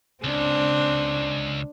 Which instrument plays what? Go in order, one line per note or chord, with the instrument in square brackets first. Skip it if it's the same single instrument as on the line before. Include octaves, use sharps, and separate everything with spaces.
[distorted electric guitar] C#2 [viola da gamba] C4 D4